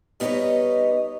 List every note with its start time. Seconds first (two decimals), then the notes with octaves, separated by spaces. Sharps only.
0.20 G3 B3 D#4 B4 C#5 D#5